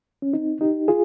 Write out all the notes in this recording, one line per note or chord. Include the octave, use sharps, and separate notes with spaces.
C#4
C4 D#4
D#4 G4
F4 G#4